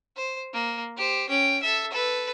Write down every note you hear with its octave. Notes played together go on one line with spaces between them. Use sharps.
C5
A#3
G4 C5
C#4 G5
A4 E5
A4 B4